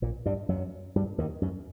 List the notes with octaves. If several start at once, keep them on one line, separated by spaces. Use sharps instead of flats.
A#1 A#2
G2 G3
F#2 F#3
G2 G3
D#2 D#3
F#2